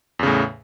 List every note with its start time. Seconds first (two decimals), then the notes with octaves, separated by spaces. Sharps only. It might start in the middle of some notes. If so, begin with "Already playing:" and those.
0.19 E2
0.23 C#3
0.26 A2